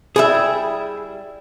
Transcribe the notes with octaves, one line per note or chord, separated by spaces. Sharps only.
G3 E4 G#4 E5